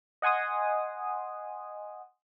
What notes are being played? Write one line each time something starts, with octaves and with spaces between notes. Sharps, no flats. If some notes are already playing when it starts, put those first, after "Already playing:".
D#5 F#5 G#5 C6 D#6